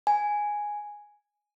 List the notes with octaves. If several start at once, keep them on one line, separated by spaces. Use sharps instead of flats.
G#5